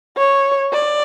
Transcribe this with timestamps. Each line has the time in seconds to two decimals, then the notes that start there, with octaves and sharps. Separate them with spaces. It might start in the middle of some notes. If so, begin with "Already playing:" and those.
0.17 C#5
0.73 D5